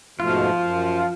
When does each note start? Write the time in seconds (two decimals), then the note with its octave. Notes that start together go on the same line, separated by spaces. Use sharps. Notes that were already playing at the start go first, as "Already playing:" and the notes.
0.20 G#2 B2 F3 A3 F4
0.59 F#2